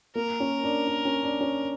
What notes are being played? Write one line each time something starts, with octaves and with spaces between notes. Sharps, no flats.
A#3 A#4
C#4
D4
D4
C#4
D4
C#4